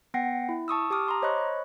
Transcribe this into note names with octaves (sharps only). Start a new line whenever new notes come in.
B3 F#5 G5 A#6 C7
E4
A5 C#6 D#6 E6
G4 A5 D6 D#6 F6
A#5 C6 D6
C5 C#5 D#5 B5 C#6 F#6